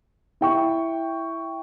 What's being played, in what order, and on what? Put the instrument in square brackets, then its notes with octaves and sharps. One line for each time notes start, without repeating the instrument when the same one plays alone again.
[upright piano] E4 G5 C#6